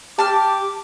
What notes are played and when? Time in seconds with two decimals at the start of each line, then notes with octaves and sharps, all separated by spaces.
0.19 G4 A5 D6 F6